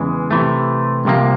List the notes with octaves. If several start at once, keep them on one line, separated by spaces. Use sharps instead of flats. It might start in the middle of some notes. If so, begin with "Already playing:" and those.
Already playing: E2 C#3 E3 G#3
C3 E3 A3
C2 C3 F3 A#3